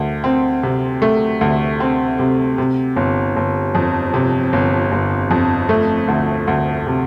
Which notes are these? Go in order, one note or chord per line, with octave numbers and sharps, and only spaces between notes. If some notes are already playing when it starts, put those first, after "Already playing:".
Already playing: D2
C4
C3
A3
D2
C4
C3
C3
G1
G1
F2
C3
G1
G1
F2
A3
D2
D2
C3